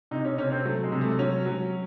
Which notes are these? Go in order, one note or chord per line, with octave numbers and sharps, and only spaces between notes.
C3 D#4
C#4
C3 C#4
C4
F#3 A3
G#3
C3
A3
F#3 C#4
F#3